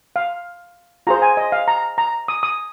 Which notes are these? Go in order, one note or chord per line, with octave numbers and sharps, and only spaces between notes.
F5
F4 G#4 C5 A#5
G#5
D#5
F5
A#5
A#5
D#6
D#6